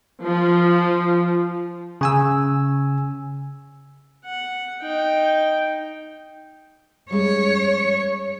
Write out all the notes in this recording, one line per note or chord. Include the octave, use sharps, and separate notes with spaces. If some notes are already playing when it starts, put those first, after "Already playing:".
F3
C#3 G#5 E6
F#5
D#4 G5
G3 G#3 C#4 C#5